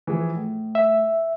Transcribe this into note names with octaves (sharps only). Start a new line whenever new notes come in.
E3 F3 G#4
A2
E5